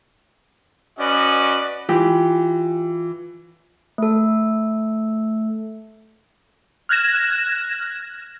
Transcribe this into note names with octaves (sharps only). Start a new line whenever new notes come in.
C#4 F#4 B4 D5 D#5
E3 F4 G4
A3 A4
F6 F#6 G#6 A#6 E7